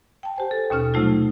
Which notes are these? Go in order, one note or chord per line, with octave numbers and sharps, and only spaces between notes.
G5 A5
G4 C5 G#5
A4
D#2 B2 C#4 F6
C3 F#3 G3 A3 D#4 F4